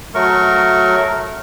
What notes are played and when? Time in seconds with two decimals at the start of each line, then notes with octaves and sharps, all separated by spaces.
0.15 F#3 A3 A#4 C#6